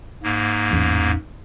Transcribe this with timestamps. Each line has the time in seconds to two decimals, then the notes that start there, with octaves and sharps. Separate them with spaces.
0.24 G#2 A#3
0.71 A1 E2 C#4